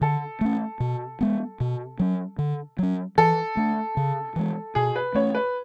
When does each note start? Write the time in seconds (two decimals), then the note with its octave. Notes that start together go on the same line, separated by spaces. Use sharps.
0.01 D3 A4
0.41 A3 C#4
0.80 B2
1.21 G#3 B3
1.60 B2
2.00 F#3 C#4
2.39 D3
2.79 F#3 C#4
3.18 E3 A4
3.57 A3 D4
3.97 C#3
4.36 E3 G#3
4.75 B2 G#4
4.96 B4
5.15 A3 C#4 C#5
5.35 B4